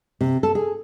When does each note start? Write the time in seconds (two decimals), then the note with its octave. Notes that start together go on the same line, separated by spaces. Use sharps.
0.21 C3
0.43 A4
0.55 G#4